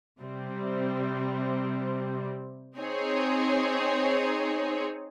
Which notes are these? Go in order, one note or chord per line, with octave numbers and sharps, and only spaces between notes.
C3 G3 C4
C4 D#4 G#4 C#5